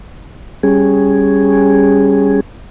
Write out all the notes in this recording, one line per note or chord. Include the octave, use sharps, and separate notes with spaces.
G3 C#4 G#4